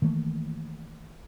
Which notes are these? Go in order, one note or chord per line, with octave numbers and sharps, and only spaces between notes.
D#3 E3 A3 A#3